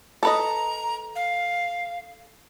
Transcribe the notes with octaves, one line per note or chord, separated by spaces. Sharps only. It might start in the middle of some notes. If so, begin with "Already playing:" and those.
A4 B4 D#5 A#5
F5